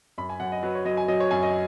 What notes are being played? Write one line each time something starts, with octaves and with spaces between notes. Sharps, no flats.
F#2 B5
G#5
F#2 F#5
D#5
F#3 B4
C#5
F#3 D#5
G#5
F#3 D#5
C#5
F#2 G#5
D#5